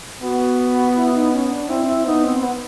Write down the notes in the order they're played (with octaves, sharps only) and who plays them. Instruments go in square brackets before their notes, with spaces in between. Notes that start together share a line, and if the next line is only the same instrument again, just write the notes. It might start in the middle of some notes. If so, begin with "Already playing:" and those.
[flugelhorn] B3 [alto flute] F#4
[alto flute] E4
D#4
C#4
D4
[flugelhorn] C4 [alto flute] E4
[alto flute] E4
[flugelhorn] B3 [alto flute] D#4
[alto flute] C4
B3